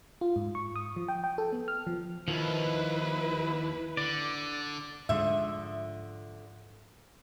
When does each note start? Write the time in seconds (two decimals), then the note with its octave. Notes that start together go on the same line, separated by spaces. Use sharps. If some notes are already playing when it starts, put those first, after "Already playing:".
0.21 F4
0.36 G#2
0.55 C#6
0.76 D#6
0.96 F3
1.08 G5
1.24 G5
1.38 A4
1.53 B3
1.68 F6
1.87 F3
2.28 D#2 D#3 F3 E4 B4
3.97 D3 D5
5.09 G#2 D3 F3 G#3 E5